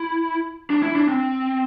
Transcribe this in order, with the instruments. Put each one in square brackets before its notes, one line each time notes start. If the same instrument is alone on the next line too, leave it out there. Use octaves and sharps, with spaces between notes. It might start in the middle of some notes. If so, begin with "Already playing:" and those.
Already playing: [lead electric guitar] E4
D4
E4
D4
C4